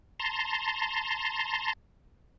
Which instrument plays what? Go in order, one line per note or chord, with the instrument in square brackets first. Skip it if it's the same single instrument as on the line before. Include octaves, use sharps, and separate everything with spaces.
[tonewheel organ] A5 A#5 C6